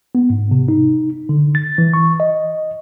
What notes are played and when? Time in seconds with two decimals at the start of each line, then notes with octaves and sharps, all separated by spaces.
0.15 B3
0.30 G#2
0.51 C3
0.68 D#4
1.29 D3
1.55 A6
1.78 E3
1.94 C#6
2.20 D#5